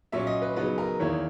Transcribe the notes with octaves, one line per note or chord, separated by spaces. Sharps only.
A#2 F#3 C#4 E5
D#5
B4
C#3 F#3 B3 D#4 B4
A#4
E2 D#3 A#3 E4 C#5